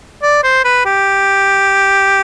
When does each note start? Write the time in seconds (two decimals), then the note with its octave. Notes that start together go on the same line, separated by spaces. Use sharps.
0.23 D5
0.44 C5
0.64 B4
0.85 G4